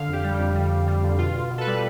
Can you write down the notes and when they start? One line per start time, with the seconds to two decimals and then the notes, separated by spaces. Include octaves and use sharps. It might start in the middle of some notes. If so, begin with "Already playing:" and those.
Already playing: D3 F5
0.08 F2 G4
0.24 G3
0.34 G4
0.39 F2
0.55 G3
0.72 G3
0.88 G3
1.04 D3
1.18 B2 F4
1.36 B2
1.50 B2
1.58 A4
1.61 B4
1.67 G3